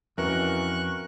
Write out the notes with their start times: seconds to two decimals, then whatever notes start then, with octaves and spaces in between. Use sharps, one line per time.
0.18 F2 E3 C#4 F#4 A#4 C#6 F#6